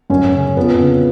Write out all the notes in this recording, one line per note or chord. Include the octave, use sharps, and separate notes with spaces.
F#2 C#4
C#3
F2 B3
C#3